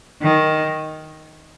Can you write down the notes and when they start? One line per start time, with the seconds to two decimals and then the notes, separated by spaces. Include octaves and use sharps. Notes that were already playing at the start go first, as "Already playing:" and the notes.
0.22 D#3